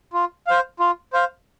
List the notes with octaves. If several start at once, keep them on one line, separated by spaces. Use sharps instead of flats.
F4
C5 F5
F4
C5 F5